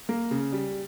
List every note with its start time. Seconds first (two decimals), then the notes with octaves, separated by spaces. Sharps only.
0.09 A#3
0.31 C#3
0.52 G3